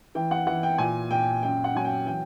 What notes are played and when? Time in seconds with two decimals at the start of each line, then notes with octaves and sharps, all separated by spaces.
0.15 E3 G5
0.31 F#5
0.47 E3 F#5
0.63 G5
0.78 A#2 G#5
1.10 A#2 G5
1.43 F#2 G5
1.64 F#5
1.75 F#3 G#5
1.85 G5
2.06 E3 G5